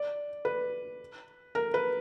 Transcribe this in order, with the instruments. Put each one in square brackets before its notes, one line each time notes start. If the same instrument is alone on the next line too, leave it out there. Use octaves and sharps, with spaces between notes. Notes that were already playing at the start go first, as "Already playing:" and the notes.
Already playing: [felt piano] D5
B4
A#4
B4